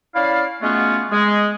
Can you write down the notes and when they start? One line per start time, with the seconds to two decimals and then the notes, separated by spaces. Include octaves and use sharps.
0.15 C#4 E4 D5 F5
0.62 G#3 A3 B3 C#4 F4 F#4
1.11 G#3